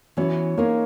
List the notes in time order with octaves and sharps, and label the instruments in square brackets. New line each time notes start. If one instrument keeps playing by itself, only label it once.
[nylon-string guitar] E3 B3 F#4 [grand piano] C#4
[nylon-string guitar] G#3 D#4 A#4 C#5 [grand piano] A#3